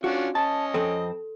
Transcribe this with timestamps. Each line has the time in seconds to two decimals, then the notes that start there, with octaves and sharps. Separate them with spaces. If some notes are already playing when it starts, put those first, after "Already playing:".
0.04 C#4 D4 F4 F#4
0.35 C#4 D#5 A5
0.74 F2 C4 A4 C6